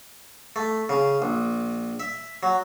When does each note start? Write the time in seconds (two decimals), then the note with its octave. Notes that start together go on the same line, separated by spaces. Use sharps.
0.56 A3
0.89 C#3
1.22 A#1
2.00 E5
2.43 F#3